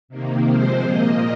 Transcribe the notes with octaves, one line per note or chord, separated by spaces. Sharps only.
C3 D#3 A#3
C3 F3 G#3 C4 C5
A#2 A#3 D#5